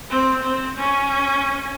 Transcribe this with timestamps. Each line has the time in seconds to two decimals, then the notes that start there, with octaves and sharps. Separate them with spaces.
0.10 C4
0.43 C4
0.77 C#4